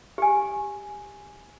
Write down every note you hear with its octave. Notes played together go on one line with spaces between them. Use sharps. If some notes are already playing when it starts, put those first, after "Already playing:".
G4 G#5